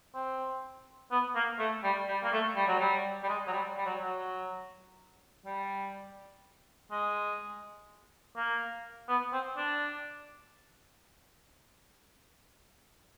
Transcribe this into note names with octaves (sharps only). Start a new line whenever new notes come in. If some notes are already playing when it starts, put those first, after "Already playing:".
C4
B3
A#3
A3
G3
G3
A#3
A3
G3
F#3
G3
G3
G#3
F#3
G3
G3
F#3
F#3
G3
G#3
A#3
B3
C4
D4